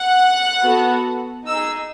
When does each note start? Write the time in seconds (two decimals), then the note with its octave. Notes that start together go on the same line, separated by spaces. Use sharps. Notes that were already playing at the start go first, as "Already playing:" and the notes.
Already playing: F#5
0.62 B3 F#4 A4
1.47 D#4 G#4 E6